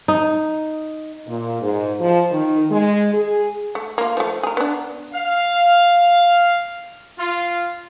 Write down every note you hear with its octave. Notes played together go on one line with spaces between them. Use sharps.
D#4
A#2
G#2
F3
D#3
G#3
G#4
A3
A#3 F4
F3 A3
G#4 A#4
B3 D4
F5
F4